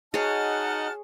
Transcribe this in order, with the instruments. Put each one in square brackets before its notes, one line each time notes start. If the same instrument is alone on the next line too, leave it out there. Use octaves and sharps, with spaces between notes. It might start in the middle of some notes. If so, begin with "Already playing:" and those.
[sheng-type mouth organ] D#4 D#5 F#5 [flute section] F#4 A5 F6 [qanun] G#4 C#5